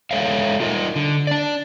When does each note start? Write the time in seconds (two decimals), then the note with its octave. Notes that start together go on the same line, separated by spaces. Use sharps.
0.11 G#3 A4 C#5 E5 F5
0.60 D#4 F4 A#4 D#5
0.96 D3
1.27 D4 D5